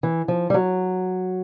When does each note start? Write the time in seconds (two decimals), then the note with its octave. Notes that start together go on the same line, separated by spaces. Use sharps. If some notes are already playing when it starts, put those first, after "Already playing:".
0.03 E3
0.28 F3
0.50 G3
0.54 F#3